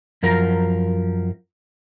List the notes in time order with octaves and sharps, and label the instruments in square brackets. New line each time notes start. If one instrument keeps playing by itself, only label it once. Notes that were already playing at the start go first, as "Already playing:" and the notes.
[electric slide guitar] F#2 F3 A#4 A#5